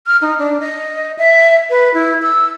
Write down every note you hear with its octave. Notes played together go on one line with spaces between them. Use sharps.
F6
D#4
D4
D#5
E5
B4
E4
E6